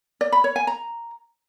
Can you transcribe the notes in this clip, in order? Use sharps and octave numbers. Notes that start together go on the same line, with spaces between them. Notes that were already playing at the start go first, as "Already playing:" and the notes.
D5
B5
C#5
G#5
A#5